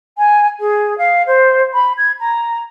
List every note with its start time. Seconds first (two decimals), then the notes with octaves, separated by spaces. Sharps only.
0.18 G#5
0.59 G#4
0.98 F5
1.26 C5
1.73 B5
1.97 G#6
2.20 A#5